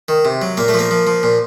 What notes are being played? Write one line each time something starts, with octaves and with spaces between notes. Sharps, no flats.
D#3
C3
F#3
A#2 A#3
A3
F3
A#3
F3
F3
A#2